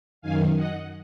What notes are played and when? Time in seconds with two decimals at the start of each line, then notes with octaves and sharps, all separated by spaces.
0.22 F#2 D#3 F5 G#5
0.56 D#5 F#5